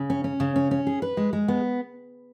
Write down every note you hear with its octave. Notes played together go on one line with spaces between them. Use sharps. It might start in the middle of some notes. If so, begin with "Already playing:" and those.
Already playing: C#3
C#4
C#4
C#3
C#4
C#4
G#4
B4
G#3
G#3
B3